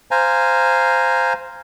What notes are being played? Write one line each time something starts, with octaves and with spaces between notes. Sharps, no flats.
C5 F5 G#5 A#5